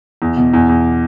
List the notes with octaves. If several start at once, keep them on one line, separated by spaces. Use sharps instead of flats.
E2
B2
E2
E2